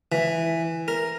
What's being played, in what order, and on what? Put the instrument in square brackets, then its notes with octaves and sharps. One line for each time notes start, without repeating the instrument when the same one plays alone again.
[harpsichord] E3
A#4